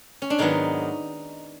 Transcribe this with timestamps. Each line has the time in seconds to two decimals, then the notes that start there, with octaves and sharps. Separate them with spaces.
0.22 C#4
0.30 D4
0.39 G#2 D#3 F#3 B3 D#4